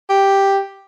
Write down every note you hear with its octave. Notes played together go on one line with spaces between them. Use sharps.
G4